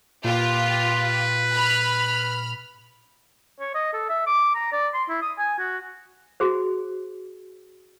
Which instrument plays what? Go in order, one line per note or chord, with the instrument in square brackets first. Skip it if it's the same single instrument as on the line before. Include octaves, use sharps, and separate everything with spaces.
[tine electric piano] A#2 [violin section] F4 G4 [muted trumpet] B4
[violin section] B5 F6
[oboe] C#5
D#5
A4
E5
D6
A#5
D5
C6
E4
D#6
G#5
F#4
[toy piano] F#4 G#4 C5